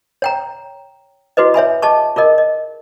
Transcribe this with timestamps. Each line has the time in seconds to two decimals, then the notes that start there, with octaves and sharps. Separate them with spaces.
0.22 C#5 G5 A#5
1.37 E4 F#4 G#4 B4 D#5
1.54 C#5 E5 G#5 B5
1.82 G#4 D#5 A5 C#6
2.16 F4 G#4 A#4 D#5
2.38 D#5